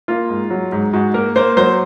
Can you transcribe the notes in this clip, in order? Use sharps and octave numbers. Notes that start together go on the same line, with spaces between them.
A#3 F4
G#2
F#3
G#2
G#2 F#4
A#3 A#4
A#3 C5
F#3 C5